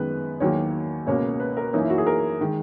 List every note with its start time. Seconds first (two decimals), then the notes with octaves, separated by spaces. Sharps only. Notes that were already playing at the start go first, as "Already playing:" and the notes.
Already playing: F#2 D#3 G#3 B3 B4
0.40 E2 D#3 F#3 A#3 C#5
1.06 C#2 B2 A#3 C#4 C#5
1.40 B4
1.57 A#4
1.73 F#2 E3 A#3 C#4 D#4
1.82 E4
1.90 F#4
1.98 G#4
2.07 A#4
2.41 D#3 G#3